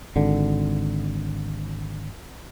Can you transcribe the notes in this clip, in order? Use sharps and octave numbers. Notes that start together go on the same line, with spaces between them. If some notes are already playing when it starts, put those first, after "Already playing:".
G#1 D3